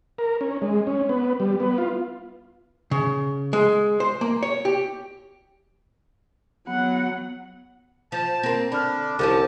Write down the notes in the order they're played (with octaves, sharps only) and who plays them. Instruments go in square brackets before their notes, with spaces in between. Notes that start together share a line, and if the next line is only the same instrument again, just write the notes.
[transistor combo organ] A#4
C#4
G#3
C#4
B3
G3
B3
F4
[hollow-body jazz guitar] C#3
G#3
C5
A#3
C#5
G4
[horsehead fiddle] F#3 F#5 [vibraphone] B3
[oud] F3 [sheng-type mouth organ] A5
[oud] A#3 C4 [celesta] A#6
[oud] D3 [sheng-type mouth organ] D4 [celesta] B5 F6
[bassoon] C2 [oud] D3 F3 C#4 [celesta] C5 D6 [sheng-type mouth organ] A5